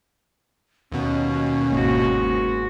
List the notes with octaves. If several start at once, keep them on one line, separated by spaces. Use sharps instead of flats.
D#2 B2 C#4
G1 G#2 A#3 F#4